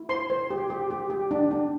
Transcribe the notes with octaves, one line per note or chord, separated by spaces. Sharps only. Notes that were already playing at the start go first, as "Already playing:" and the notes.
Already playing: E4
C5 C6
C5
G4
G4
G4
G4
D4
D4